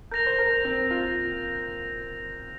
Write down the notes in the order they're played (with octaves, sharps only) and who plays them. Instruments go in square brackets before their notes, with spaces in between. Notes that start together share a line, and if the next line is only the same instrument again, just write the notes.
[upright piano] A#4 [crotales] G6 A#6 F7
[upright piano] C5
A#4
C4
F4